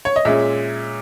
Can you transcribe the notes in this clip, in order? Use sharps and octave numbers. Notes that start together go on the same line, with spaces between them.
C#5
D#5
A#2 G#3 C#4 E5